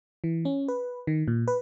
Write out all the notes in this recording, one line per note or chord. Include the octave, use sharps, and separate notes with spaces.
E3
C#4
B4
D#3
A#2
B4